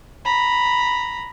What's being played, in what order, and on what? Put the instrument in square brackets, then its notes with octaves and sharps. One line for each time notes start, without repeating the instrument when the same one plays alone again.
[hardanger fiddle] A#5 B5